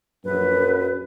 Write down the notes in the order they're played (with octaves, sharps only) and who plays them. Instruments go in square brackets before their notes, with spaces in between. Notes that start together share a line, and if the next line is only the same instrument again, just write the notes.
[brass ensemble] A#1 F#2 [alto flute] B4